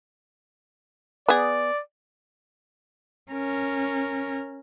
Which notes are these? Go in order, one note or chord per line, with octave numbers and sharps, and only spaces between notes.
B3 G#4 D5
C#4 A#4